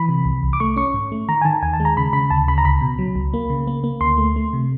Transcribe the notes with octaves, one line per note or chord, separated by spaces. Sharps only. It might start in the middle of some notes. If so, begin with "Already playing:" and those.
Already playing: E3 B5
C3
C2
C2
D6
A3 C#6
C#4 C#6
G#2
A3
D#3 A#5
G#5
D#3 A5
D#2 G#5
A5
G#3
A#5
C#3 B5
C#3 B5
D2 A5
C#3 B5
A#5
C#2 B5
B2
F#3
C#2
A#3
C#3
A#3
A#3
D2 C6
A3
A3
C3